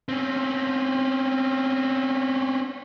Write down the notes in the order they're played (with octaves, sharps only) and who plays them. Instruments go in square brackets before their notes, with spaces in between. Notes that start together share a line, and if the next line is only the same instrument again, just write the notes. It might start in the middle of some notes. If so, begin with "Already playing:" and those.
[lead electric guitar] C4 C#4